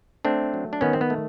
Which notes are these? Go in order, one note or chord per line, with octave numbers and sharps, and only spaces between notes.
A3 C4 D4
F#3
D4
D#3 B3 C#4
C4
B3
A3